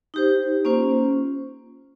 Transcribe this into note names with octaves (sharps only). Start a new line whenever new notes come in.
D#4 G4 C5
A#3 C#4 F4 C5